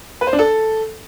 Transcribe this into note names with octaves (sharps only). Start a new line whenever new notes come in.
B4
C5
D4
A4